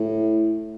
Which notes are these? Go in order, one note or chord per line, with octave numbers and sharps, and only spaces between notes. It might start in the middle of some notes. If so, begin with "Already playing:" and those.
Already playing: A2